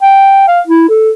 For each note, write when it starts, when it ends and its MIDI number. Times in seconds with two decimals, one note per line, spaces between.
0.02 0.43 79
0.48 0.61 77
0.67 0.84 64
0.89 1.10 69